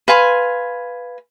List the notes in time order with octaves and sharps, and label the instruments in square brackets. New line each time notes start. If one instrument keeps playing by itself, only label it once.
[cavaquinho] B4 F5 G#5 C6